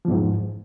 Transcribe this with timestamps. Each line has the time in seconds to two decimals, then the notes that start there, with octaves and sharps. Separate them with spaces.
0.05 F3
0.08 E2
0.11 G#2